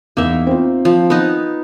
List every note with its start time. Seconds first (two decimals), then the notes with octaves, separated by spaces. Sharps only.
0.17 E2 A#3 D#4 E5
0.47 C4 F4
0.85 F3
1.10 B3 D#4